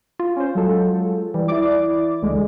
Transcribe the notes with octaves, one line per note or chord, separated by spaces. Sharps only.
F4
C#4 C5
F#3 G#3 A4
E3 G3
E4 D5 D6
C#2 D3 G#3